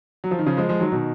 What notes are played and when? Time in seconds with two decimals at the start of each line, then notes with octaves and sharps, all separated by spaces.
0.24 F#3
0.31 F3
0.39 D#3
0.46 C#3 F3
0.57 F3 G#3
0.69 F3 G#3
0.80 D#3 F#3
0.92 B2 D#3